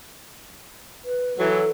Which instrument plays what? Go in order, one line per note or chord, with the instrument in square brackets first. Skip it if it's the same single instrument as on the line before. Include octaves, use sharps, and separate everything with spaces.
[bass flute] B4
[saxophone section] E3 F#3 [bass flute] A4